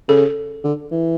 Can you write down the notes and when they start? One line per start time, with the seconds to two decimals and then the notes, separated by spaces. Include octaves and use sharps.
0.08 C#3 A4
0.64 D3
0.91 E3